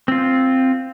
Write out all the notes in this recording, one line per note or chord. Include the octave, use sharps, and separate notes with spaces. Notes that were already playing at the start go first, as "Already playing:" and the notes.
C4 F4